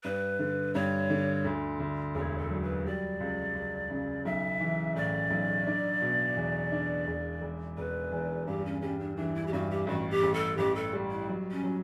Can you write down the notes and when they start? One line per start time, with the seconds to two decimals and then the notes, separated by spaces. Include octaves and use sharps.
0.04 G2 B4
0.39 D3
0.74 G2 C#5
1.10 D3
1.45 D2
1.80 D2
2.15 E1 C#5
2.38 A4
2.50 F#3
2.62 B4
2.86 G3 D5
3.20 C#2
3.55 C#2
3.91 C#3
4.25 B1 E5
4.61 E3
4.96 A2 D5
5.31 B1
5.67 D4
6.02 B2
6.37 E2
6.72 D4
7.07 E1
7.41 E1
7.78 E1 B4
8.12 E2
8.47 G2 G4
8.65 C#4
8.82 G3 C#4
8.99 D4
9.17 E3 D4
9.35 E4
9.47 G4
9.53 G2 F#4
9.71 G4
9.87 A1 F#4
10.10 G4
10.23 A1
10.34 A4
10.57 A1 G4
10.75 A4
10.93 G3
11.11 E4
11.28 F#3
11.51 C#4
11.64 F#3